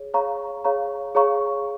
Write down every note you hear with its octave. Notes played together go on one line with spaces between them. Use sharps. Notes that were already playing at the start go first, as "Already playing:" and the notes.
Already playing: G#4 C#5
G#4 C#5 F5 A#5 C#6
G#4 C#5 F5 A#5 C#6
G#4 C#5 F5 A#5 C#6